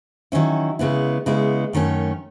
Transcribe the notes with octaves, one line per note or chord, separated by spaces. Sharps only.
D#3 F#3 C#4 E4
C#3 G#3 B3 E4
C#3 G#3 B3 E4
F#2 D#3 A3 C#4